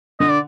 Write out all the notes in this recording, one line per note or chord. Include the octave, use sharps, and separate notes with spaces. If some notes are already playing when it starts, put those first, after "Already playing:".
D3 D#5
D5